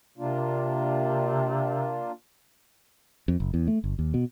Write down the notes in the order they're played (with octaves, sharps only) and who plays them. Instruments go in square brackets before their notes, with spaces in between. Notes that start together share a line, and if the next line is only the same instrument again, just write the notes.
[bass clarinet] C3 [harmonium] A#3 D4 F4
[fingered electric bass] F2
F#1
E2
A3
G1
D#2
B2